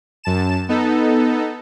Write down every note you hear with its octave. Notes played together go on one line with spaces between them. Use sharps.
F#2 A5 E7
B3 D#4 A4